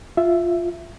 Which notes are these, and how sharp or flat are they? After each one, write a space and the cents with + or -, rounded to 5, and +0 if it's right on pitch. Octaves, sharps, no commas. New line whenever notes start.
F4 +0 E5 +10